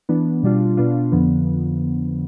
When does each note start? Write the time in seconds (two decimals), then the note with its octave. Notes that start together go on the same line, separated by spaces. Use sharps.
0.09 E3 B3 D4
0.43 B2 G3 D4 F4
0.77 B2 B3 D4 F4
1.12 F2 D3 F3 B3